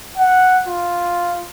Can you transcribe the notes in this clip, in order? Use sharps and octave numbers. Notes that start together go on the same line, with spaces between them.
F#5
F4